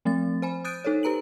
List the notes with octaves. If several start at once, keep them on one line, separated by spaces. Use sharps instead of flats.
F3 A3 C4 A6
C5 G#5 B5
D#6 F#6 G6 A6 D7 D#7
D#4 A4 C5 C#5
G4 B4 A#5 D7 F#7